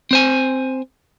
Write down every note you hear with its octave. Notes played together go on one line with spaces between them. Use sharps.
C4 C5 G#5